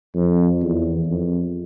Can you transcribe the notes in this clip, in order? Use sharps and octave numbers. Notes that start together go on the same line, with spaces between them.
F2
E2
F2